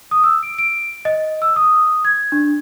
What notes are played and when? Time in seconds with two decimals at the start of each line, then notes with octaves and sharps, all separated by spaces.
0.11 D#6
0.24 E6
0.43 D7
0.58 D7
1.05 D#5
1.42 E6
1.56 D#6
2.05 G#6
2.32 D4